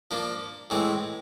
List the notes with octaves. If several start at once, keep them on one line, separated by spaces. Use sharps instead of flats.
F3 A#3 D4
A2 E3 G#3 C4